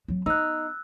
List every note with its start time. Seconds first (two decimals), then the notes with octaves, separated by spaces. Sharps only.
0.08 F#3 C4
0.26 B3 D#4 E6 F#6